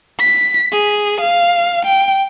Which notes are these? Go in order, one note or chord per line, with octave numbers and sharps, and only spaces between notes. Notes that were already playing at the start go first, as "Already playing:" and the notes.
B6
G#4
F5
G5